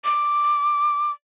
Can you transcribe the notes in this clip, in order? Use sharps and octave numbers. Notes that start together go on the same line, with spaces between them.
D6